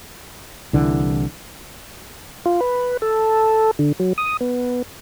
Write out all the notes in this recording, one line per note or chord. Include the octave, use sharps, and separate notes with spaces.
C2 D3 E3
F4
B4
A4
D3
F#3
D#6
B3